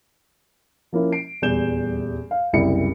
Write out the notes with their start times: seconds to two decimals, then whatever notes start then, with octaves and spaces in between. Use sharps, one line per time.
0.93 F3 A#3 C#4 E4
1.12 C7 D7
1.42 D#1 E2 G3 G6 E7 G7
2.31 F5
2.53 F#1 C2 E4 C#7